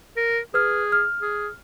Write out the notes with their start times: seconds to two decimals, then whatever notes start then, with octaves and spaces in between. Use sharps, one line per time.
0.17 A#4
0.54 G#4 B4 F6
0.92 F6
1.22 G#4